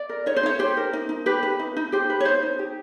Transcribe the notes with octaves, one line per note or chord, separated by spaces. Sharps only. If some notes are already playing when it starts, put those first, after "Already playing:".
Already playing: D5
A#4
D#4 C#5
C5
D#4 C#5
G4 C5
A#4
D#4
D#4
G4 B4
B4
D#4
D#4
G4 C5
B4
C#5
D#4 C5
D#4
G4